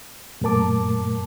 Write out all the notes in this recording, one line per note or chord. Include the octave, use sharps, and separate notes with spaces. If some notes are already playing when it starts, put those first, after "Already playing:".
F#2 A#2 A3 A#4 A5 D6